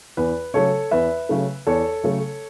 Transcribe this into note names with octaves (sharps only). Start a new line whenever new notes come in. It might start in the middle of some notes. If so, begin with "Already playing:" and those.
E2 B4
C#3 F#3 A3 A4 C#5
E2 B4 E5
C#3 F#3 A3
E2 A4 C#5
C#3 F#3 A3